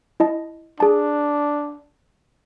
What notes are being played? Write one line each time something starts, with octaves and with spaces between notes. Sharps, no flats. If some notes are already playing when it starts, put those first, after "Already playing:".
E4 D#5 A5
D4 G#4 A5